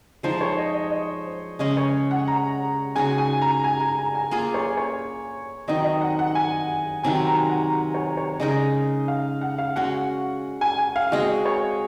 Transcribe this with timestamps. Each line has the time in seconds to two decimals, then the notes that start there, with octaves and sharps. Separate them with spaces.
0.23 F3 G#3 D#4 C5
0.41 C#5
0.58 D#5
0.74 D#5
0.91 D#5
1.26 C5
1.59 C#3 G#3 C#4 D#5
1.77 C#5
2.11 F#5
2.28 A#5
2.96 C#3 G#3 D#4 F#4 G#5
3.18 G#5
3.42 A#5
3.64 G#5
3.80 A#5
3.98 A#5
4.15 G#5
4.31 A#3 F4 G#4 G#5
4.54 C#5
4.77 C#5
5.68 D#3 F#3 C4 D#5
5.84 D#5
6.02 F#5
6.19 F#5
6.35 G#5
7.03 C3 D#3 F#3 C4 G#5
7.27 A#5
7.49 F#5
7.94 C#5
8.17 C#5
8.40 C#3 G#3 D#4 A#4 D#5
9.08 F5
9.41 F#5
9.58 F5
9.76 G#3 C#4 F#4 F#5
10.61 G#5
10.78 G#5
10.96 F5
11.12 G#3 C4 F#4 D#5
11.46 C#5